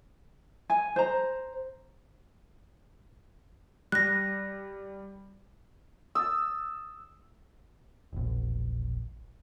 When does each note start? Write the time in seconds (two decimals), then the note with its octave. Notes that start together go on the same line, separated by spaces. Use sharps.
0.70 G#5
0.96 C5 A#5
3.92 G3 F#6 A#6
6.15 D#6 E6 A6
8.13 E1 A#1